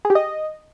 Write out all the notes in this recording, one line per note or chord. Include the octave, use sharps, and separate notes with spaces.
G#4
G4
D#5